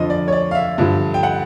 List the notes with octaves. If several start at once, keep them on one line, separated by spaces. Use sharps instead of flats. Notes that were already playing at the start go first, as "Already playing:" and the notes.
Already playing: F2 D3 F3 D#5
D5
C#5
D5
F5
E5
G2 D3 F3
G5
F#5